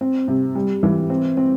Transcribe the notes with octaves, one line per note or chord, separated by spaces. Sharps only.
C4
C3
G3
E3
C4
C4